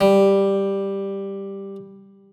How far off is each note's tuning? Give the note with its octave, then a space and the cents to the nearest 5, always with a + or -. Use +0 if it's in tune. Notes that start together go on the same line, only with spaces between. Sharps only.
G3 +5